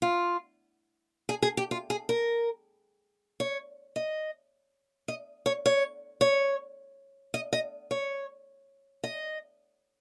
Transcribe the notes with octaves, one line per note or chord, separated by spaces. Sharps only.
F4
G#4
G#4
G4
F4
G#4
A#4
C#5
D#5
D#5
C#5
C#5
C#5
D#5
D#5
C#5
D#5